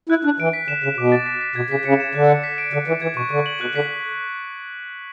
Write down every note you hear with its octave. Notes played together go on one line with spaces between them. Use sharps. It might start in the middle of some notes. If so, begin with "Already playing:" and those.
E4 F#6
D4 F#6
E3 D7
B6
D3 E7
C#3 E7
B2 D6
A6
B6
B6
B2 G#6
C#3 B6
C#3 C#7
E7
D3 F#6
C#7
B6
D7
D3 F#6
E3 D7
E3 G#6
B2 C#6
D3 C#6
F#7
B2 F#6
D3 B6